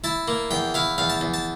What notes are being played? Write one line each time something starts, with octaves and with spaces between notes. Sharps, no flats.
E4 A5
A#3
E2 G5
E4 F5
E2 F5
A5
E2
A5